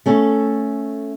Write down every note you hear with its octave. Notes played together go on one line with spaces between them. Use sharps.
A3 C#4 A4